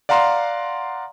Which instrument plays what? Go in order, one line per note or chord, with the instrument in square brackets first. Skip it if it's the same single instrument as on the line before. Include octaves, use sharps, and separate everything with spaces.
[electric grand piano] D5 F5 F#5 A#5 C6